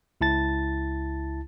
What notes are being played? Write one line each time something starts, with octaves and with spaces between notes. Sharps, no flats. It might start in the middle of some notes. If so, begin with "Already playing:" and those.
C#2 E4 A5 A6